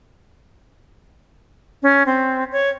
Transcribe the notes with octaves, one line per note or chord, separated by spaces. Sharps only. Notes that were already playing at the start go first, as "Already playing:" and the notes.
C#4
C4
C#5